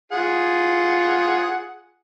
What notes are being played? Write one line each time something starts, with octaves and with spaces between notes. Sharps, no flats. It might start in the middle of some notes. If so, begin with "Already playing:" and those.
F4 G#4 F#5